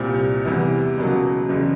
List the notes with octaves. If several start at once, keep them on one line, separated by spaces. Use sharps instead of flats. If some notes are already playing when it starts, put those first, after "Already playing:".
Already playing: C2 A#2 G3 C4
E2 C3 E3 G3 B3
C#2 B2 F#3 A#3
F#1 E2 C#3